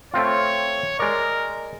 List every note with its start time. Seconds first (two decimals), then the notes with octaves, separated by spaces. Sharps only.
0.14 A3 C4 F4 C#5
0.99 G#3 A#4 D5